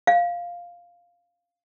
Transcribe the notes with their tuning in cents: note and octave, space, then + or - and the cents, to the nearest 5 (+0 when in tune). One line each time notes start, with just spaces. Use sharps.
F5 +0